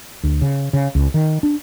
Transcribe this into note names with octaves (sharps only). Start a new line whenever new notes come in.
D2
C#3
C#3
C#2
D#3
D4